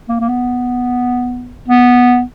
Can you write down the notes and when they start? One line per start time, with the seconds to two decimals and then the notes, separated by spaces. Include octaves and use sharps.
0.09 A#3
0.20 A#3
0.29 B3
1.68 B3